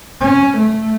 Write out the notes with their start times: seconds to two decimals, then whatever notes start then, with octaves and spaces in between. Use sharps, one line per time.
0.21 C#4
0.58 A3